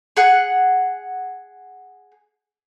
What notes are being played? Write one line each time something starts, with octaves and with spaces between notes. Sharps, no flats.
G#4 F#5